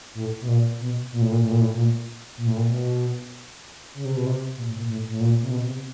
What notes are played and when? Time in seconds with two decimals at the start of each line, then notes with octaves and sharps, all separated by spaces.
0.15 A2
0.41 B2
0.48 A#2
0.80 B2
1.12 A#2
1.22 A2
1.32 A#2
1.43 A2
1.51 A#2
1.60 A2
1.74 A#2
2.37 A#2
2.47 A2
2.57 A#2
2.68 B2
3.94 C#3
4.05 C3
4.16 B2
4.26 C3
4.57 A#2
4.68 A2
4.78 A#2
4.88 A2
5.09 A2
5.20 A#2
5.42 C3
5.51 B2
5.66 C3